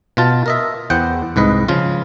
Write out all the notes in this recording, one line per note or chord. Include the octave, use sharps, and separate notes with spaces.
B2 F4 A5
A#4 D#5 E5
E2 C5 F#5 G5
C2 G#2 B4 D#5
C#3 F3 F4